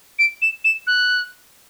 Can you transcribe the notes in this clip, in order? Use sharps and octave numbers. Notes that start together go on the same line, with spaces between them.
D7
E7
E7
F#6